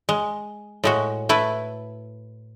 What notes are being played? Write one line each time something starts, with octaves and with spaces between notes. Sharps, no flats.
G#3
A2 G#3 F#4
A3 E4 B4